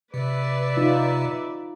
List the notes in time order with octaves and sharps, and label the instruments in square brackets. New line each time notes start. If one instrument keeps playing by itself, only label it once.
[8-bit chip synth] C3 [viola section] B4 D5 E5
[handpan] D#4 F4